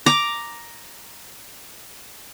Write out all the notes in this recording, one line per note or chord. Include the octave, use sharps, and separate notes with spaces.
A#5 D6